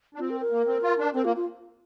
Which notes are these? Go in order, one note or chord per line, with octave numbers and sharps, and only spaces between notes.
D4
C4 F4
A#4
A#4
A#3
C4
F4
D4
C4 A#4
A#3 F4
F4